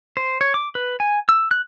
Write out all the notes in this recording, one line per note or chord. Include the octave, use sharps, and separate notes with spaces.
C5
C#5
D6
B4
G#5
E6
F#6